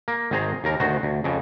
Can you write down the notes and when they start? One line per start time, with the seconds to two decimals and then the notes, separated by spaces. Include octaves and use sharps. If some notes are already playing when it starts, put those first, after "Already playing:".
0.08 A#3
0.31 G#1 D#3 G#4 C5 A#5
0.64 D#2 A#4
0.80 D2 D#3 F#4 C5
1.03 D2
1.24 F2 C#3